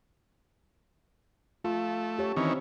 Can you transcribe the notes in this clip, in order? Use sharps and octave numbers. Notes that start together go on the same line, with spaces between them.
A3 F4
G4 C#5
D#3 E3 C4 C#4